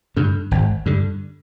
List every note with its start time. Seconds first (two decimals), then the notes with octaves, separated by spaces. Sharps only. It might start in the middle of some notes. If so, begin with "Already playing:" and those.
0.16 G2 D3
0.51 G#1
0.86 G2 D3